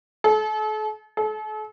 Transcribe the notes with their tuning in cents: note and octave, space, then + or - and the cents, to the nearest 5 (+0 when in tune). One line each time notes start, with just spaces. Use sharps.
A4 -40
A4 -40